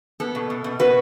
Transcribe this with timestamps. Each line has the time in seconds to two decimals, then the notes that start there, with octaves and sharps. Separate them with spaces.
0.20 B3 A4
0.35 B2
0.50 B2
0.64 B2
0.79 B2 F#4 B4